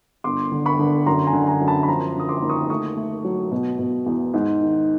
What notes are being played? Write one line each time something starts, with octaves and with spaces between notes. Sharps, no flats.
G1 C6 D6
D3
B5 C#6
D3
F#2 A#5 C6
G#5 A#5
D3
G#5 A#5
F#2
A5 B5
B5
F3 A#5 C6
D3 D#6
C6 D6
D#2
C#6 D#6
A3 C#6 D#6
A3
F#3
B2
B2
E2
G#2
D#3